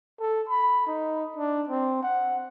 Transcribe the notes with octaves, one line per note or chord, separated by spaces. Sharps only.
A4
B5
D#4
D4
C4
F#5